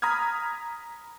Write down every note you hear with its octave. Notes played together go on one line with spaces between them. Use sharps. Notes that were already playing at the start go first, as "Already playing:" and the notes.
A#5 B5 D#6 F6 G#6